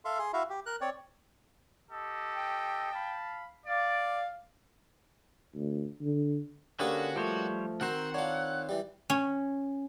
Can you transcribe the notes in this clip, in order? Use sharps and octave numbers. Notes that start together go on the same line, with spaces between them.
A4 E5 F5 C6
G#4 C6
E4 F#4 E5 F5
G4
A#4 F#6
C4 C#5 D5
G4 A4 D#5
G5
F5 A5 B5
D5 F5
D2
D3
D3 A#3 C#4 D4 F#4 G4 B4 D#6
F3 G3 A3 C5 C#5
D#3 C4 F#4 A#4 C5 F#5
D4 F4 C#5
E3 G3
C#4